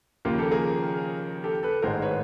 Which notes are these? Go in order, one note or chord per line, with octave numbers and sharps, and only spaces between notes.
D#2 C#3 F3 A#3 F4 G4
G4 A4
G#4 A#4
G4 A4
A4 B4
A1 G#2 D#3 G#3 A#4 C5
B4 C#5